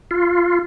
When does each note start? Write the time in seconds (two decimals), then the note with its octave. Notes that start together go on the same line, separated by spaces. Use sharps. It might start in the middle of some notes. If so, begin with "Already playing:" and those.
0.11 F4